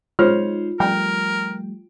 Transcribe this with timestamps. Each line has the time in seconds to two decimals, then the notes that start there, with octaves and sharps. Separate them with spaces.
0.19 G#3 D#4 F4 C5 C#5 F6
0.80 F3 G3 A3 A#4 G5